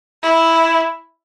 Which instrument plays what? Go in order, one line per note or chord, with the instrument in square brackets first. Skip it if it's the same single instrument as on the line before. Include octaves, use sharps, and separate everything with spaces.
[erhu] E4